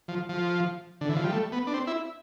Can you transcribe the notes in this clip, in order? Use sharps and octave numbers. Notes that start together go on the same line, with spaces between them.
F3
F3
D3
E3
F3
G3
A3
B3
D4
C4
E4